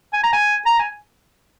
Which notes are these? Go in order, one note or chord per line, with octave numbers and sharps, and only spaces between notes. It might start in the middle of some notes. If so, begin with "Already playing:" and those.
G#5
A#5
G#5
A#5
G#5